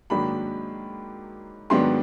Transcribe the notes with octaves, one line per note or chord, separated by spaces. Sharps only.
G#2 D#3 F#3 A#3 D4 B5
G#2 D#3 F#3 B3 D4 C6